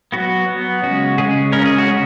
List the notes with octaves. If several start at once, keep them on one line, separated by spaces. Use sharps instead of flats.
F#3 B3 F#4
F#3 B3
C#3 G#3 C#4 F#4
C#3 G#3 C#4 G#4
C#3 G#3 C#4 A#4
G#4
F#4
C#3 G#3 C#4